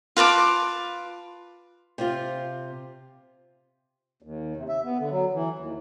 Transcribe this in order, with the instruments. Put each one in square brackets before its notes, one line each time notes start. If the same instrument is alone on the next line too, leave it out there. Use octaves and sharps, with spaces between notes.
[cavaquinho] F4 B4 A5 D6
[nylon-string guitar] C3 C4 F4
[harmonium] D#2
C3
E5
B3
D3
F#3
E3
D#2